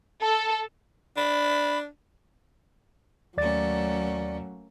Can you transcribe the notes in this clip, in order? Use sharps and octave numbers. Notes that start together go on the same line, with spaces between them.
A4
D4 B5
D#2 F#3 A3 A#3 C#4 D5 A6